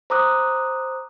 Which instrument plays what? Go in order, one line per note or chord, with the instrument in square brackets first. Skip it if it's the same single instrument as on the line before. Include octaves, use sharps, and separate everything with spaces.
[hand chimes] C5 A#5 D6 D#6 F#6